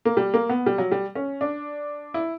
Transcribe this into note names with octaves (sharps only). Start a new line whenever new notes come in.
A#3
G3
A#3
B3
G3
F#3
G3
C#4
D4
E4